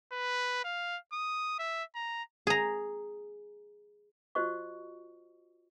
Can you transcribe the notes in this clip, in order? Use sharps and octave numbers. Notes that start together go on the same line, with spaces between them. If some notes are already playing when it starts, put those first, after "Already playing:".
B4
F5
D#6
E5
A#5
G#4 A#5
F4 F#4 C5 D#5 C#6